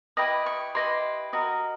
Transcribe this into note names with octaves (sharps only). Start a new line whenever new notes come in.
E4 G4 B4 D#5 D#6
C#6
E4 G4 B4 D#5 C6
F#4 A#4 D#5